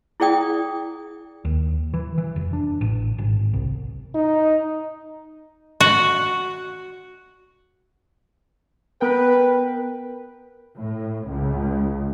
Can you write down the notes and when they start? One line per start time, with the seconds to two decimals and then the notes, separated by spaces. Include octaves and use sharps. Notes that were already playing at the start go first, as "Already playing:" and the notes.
0.20 E4 G#4 D5 G5 D#6
1.45 D#2
1.94 E3
2.18 E3
2.36 F1
2.53 D4
2.81 A1
3.18 G#1
3.53 C2
4.15 D#4
5.81 F#4
9.01 B3 A#4 B4 G5
10.77 A2
11.27 C#2